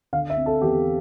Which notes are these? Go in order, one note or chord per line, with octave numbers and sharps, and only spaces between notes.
D3 F5
E5
C4
A4
E2 G4